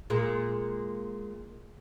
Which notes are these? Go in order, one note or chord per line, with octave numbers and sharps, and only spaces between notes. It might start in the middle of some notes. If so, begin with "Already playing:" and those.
A#2 G#3 A#3